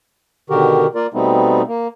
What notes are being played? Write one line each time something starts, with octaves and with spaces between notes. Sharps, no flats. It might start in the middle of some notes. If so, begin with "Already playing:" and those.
B2 D3 D#3 F#4 G4 A#4
A#3 F4 A#4 D5
B2 G3 A3 B3 C4 D#4
A#3